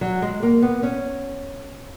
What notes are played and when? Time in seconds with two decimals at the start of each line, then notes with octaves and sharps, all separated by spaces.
0.01 F#3
0.22 G#3
0.43 A#3
0.62 B3
0.83 C#4